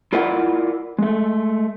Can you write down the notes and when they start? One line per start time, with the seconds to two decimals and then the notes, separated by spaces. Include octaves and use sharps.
0.13 E4 F4 A#4 D5 F#5
0.99 G#3 A3